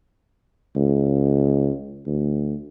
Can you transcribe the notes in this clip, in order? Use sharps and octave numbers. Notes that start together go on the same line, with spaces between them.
C#2
D2